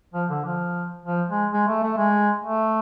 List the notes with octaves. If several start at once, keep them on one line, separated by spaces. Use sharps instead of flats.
F3
D3
F3
F3
G#3
G#3
A3
A3
G#3
A3